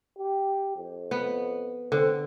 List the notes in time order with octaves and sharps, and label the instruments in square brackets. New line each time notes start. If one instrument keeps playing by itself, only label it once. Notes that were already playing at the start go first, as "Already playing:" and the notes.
[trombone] G4
F2
[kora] B3
[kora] D3 [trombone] C4